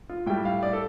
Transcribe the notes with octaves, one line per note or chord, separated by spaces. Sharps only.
F4
A2 G3 G5
F5
D5
A4